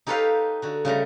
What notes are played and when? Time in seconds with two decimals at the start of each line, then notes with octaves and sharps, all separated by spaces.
0.07 D#4 G4 A4 B4 C#5 F5
0.62 D3 F#4
0.85 C#3 G3 A3 A#5